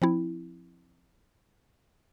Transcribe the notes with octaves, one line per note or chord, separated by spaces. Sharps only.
F3 C4 E4